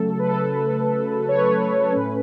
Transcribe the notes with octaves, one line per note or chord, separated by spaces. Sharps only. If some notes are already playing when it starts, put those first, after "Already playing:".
Already playing: C#3 F#3 A3 A4
B4
A4
C#5
B4
A4
A2 A3 C#4 B4